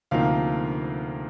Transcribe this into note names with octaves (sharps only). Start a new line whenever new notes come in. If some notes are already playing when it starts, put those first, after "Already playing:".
D2 C3 F3 A#3 D#4 F5